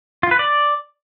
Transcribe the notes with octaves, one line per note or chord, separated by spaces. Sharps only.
F4
B4
D5